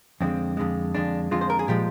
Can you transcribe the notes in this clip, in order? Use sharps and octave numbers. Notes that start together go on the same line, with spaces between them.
F2 D3 G#3 C4
F2 D3 G#3
F2 D3 G#3 D4
F2 D3 G#3 F4
C5
A#4
G#4
A#2 F3 G#3 G4